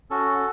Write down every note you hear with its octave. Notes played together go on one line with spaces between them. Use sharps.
C#4 F#4 A4